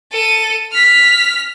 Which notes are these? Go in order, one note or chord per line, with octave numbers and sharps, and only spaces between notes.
A4 D#7
F6 B6